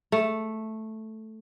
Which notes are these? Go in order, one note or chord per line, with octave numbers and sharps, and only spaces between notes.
A3